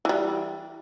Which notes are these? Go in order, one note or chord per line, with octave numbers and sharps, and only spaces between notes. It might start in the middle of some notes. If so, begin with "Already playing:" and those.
E3 G3